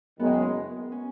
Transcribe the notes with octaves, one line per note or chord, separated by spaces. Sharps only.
F#1 F#2 D#3 G#3 B3
C#4